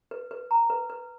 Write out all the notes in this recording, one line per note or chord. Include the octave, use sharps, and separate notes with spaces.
B4
B4
A#5
B4
B4